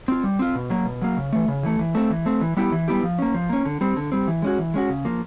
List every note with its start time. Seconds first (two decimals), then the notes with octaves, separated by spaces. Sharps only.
0.08 C4 F4
0.23 G3
0.39 C4 F4
0.55 B2
0.70 F#3 A#3
0.86 B2
1.02 F#3 A#3
1.17 C#3
1.33 E3 A3
1.48 C#3
1.63 E3 A3
1.79 E3
1.95 A3 C4
2.10 E3
2.26 A3 C4
2.41 E3
2.57 G3 B3 E4 G4
2.72 E3
2.88 G3 B3 E4 G4
3.03 F3
3.19 A#3 C#4
3.34 F3
3.49 A#3 C#4
3.65 D3
3.81 G3 C4
3.97 D3
4.12 G3 C4
4.28 E3
4.42 G#3 C#4 F#4
4.58 E3
4.74 G#3 C#4 F#4
4.89 C#3
5.05 F3 A#3